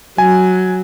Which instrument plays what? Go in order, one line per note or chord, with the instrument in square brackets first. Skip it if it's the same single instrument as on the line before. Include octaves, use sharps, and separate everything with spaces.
[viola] F#3 [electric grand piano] G#5